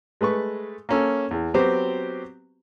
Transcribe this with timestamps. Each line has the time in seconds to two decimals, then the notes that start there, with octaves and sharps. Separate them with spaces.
0.21 G#3 A3 B4 C#6
0.89 A#3 C#4 A4
1.31 E2
1.54 F#3 B3 C4 F#4 G4 C5